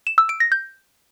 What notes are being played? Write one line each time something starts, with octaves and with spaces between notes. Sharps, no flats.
E7
E6
D7
A#6
G6